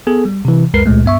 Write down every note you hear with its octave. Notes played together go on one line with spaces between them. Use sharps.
B3 G#4 A4
G3
C3 E3
C#2 F#2 G#3 A#4 B4 C7
C#2 A#2 G#3 A3
G2 B3 E5 C#6